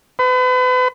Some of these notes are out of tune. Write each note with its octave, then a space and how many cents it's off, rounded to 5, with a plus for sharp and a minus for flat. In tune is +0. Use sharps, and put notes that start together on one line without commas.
B4 +40